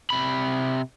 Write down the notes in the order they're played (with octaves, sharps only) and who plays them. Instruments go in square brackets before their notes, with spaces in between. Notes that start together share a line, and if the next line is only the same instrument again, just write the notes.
[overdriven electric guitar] C3 B5